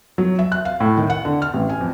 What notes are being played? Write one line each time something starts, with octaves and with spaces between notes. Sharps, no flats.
F#3
E5
F#6
F5
A2
D#3
F#5
D3
F6
A1
G#5
F2